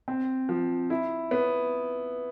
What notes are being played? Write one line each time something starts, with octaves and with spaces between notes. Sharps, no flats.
C4
F3
E4
B3